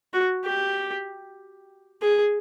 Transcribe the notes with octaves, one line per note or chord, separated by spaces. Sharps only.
F#4
G4
G#4